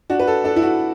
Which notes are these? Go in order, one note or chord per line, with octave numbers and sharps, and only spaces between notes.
D4 F#4
B4
A4
D4 A4
E4
F#4